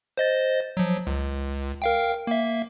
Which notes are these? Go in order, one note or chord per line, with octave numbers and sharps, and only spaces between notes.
C5 D#5 A6
F3 F#3
C#2
A#4 F5 G5
A#3 E5